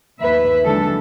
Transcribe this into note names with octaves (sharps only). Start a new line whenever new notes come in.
D#2 B4 E5
D3 E3 F#3 G#3 A4